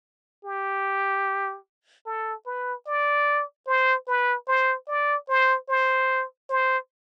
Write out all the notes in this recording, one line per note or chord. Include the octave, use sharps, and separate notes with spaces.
G4
A4
B4
D5
C5
B4
C5
D5
C5
C5
C5